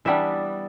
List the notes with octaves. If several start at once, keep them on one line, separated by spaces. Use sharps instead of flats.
E3 G3 B3 D4 E5